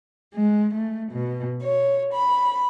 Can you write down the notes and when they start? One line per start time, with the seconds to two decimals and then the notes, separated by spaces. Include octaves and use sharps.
0.34 G#3
0.75 A3
1.12 B2
1.63 C#5
2.13 B5